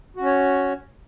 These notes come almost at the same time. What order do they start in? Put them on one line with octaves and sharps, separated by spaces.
F#4 C#4 C#5